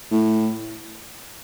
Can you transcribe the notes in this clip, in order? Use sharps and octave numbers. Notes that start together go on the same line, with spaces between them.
A2